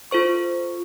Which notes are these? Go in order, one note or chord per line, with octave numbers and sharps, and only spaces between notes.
F4 A4 C5 C#6